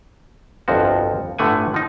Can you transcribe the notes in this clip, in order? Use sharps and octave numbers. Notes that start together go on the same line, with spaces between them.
G1 C2 F2 F3 F#4
G1 A2 D3 A3 F#5 G#5
F3 D#4